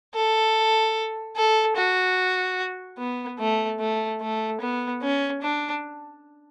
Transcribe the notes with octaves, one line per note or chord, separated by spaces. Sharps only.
A4
A4
F#4
B3
A3
A3
A3
B3
C#4
D4